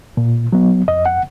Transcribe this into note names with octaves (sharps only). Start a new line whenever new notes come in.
A#2
F#3 B3
F2 D#5
F#5